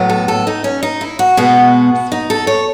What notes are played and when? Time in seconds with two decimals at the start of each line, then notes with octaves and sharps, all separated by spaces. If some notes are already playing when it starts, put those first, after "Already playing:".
Already playing: A2 F#3 B3
0.09 A4
0.28 A4
0.47 D#4
0.64 C#4
0.83 D#4
1.01 E4
1.19 F#4
1.37 B2 G#3 B3
2.12 D#4
2.30 A4
2.47 C#5